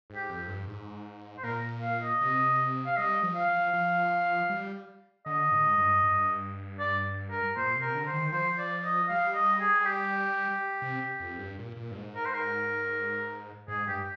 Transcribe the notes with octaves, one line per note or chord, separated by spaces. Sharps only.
G#2
G4
F2
G2
G#2
C5
A#2 A#4
F5
D#5
C3
F5
G3 D#5
F3
F5
F3
F3
G3
D3 D#5
G#2
G2
G2
D5
A#4
A#2 C5
C3
A#4
D3
C5
D#3
F3 C5
D5
D#5
G3 F5
D#5
G#4
G#4
G4
C3
F2
G2
A#2
A#2
G2
G#2
A#4
C5
A#4
G#2 G#4
G2 G4